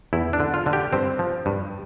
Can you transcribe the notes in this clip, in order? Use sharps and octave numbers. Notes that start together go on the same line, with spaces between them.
E2 E4
D4
D3
F4
D3
G4
G2 C4
F3
G2